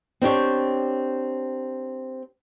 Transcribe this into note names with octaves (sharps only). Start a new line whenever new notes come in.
C4 D4 G4 C#5